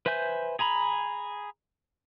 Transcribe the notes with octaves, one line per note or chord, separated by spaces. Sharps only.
B4 C5 E5 G#5 G6
G#4 G#5 A#5 B5